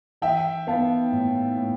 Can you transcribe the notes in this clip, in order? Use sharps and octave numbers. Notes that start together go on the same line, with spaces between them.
E3 E5 G5
B3 F5 A5
A2
A2